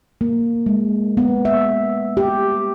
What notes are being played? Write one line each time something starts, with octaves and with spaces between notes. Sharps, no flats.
A#3
G#3
B3
E5
G4